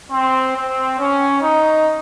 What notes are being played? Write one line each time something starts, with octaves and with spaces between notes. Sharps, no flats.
C4
C4
C#4
D#4